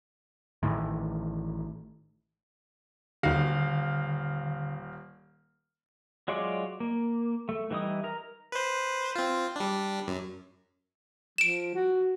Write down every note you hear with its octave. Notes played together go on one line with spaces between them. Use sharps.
A1 A2 D#3 E3
D#1 D#2 D3 F#4 F5
F#3 G#3 F4 C#5 D5
A#3
A3
E3 G3 D#4 E4 D#6
A#4 A#5
B4 C5
C4 F4
G3 D4
F#2
F3 D7 E7
F#4